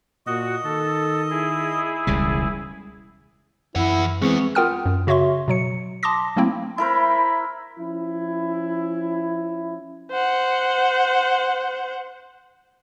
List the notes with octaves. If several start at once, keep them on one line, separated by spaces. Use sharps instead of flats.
A#2 F#4 D#5
D#3 A4
E4 G#4
E1 C#2 G3
F#2 E3 E4 F#5
E2 E3 G#3 B3 C4 C#6
F4 A#4 F#5 G5 D#6 F6
F#2
C#3 F#4 C#5 E5 C6 C#6
B2 F#3 C#7
A5 C6 D6 D#6 A#6
F#3 A3 A#3 C4 E4
E4 A#4 C5 B5
F3 C#4 E4
C5 F#5